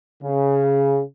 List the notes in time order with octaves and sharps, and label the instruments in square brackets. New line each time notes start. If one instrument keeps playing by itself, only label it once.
[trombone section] C#3